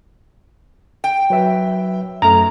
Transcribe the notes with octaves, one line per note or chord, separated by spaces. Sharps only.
G5
F#3 B4 E5
F#2 A3 A#5